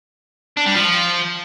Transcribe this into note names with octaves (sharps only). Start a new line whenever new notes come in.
D4
G3
F3